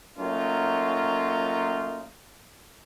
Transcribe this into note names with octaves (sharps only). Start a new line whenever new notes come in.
F#3 A3 A#3 C#4 D#4 F4